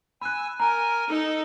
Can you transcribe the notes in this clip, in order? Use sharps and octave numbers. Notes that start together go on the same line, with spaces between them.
G#5 B5 E6 F#6
A#4 G#5 A#5
D#4 A4